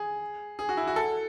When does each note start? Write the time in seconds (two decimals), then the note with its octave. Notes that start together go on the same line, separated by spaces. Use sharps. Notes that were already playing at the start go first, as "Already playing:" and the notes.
Already playing: G#4
0.59 G#4
0.69 F#4
0.77 E4
0.87 F#4
0.96 A4